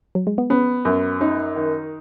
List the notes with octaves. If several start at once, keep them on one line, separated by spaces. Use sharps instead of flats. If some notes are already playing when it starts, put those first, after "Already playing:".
F#3
G#3
B3
B3 C#4
F#2
C#4 D#4
D#3